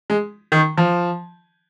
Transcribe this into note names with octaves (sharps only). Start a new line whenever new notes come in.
G#3
D#3
F3